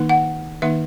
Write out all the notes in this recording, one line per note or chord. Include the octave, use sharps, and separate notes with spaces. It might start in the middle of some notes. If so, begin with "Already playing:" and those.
Already playing: D#3 A#3 D#4
F#5
D#3 A#3 D#4 E5